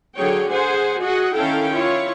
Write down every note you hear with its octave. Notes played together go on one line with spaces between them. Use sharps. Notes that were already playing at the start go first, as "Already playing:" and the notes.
D3 F#3 G#4 C#5 G5
G#4 C5 F#5 G#5
F#4 G#4 D#5 F#5
D#3 C#4 E4 A4 F5 G5
E4 F4 C#5